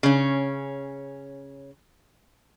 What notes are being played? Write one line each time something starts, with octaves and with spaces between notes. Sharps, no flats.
C#3 C#4